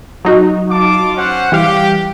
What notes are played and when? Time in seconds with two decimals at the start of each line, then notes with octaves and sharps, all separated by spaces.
0.25 F#3 D#4 F#4
0.69 F4 A5 D6
1.16 C#4 C5 F#5
1.52 E3 G3 G4 F5